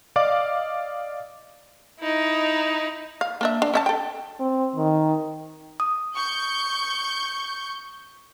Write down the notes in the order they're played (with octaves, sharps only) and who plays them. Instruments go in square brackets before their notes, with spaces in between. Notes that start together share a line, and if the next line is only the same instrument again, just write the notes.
[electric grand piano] D5 D#5 F5 D6
[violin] D#4 E4
[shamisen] F5
A#3 D4 E5
D4
C#4 E5 A5
A4 G5
[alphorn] C4
D#3
[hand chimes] D#6
[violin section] C#6 G6